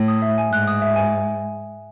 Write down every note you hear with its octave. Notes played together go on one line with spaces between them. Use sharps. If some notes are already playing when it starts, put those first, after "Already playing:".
Already playing: A2
D#6
E5
G#5
G#2 F#6
D#6
E5
G#5